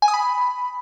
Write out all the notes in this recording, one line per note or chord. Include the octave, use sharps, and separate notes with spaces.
G#5
D#6
B5